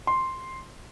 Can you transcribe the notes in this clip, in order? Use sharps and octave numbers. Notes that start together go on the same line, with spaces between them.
C6